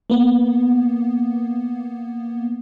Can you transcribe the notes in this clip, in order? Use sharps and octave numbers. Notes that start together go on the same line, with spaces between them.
A#3 B3